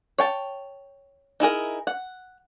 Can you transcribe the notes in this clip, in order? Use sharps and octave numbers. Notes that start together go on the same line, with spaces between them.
C#5 G5 A5
D#4 E4 G#4 A#4
F#5